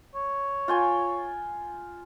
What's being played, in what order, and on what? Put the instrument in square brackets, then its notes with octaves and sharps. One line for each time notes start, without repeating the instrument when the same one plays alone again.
[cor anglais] C#5
[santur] F4 G5 G#5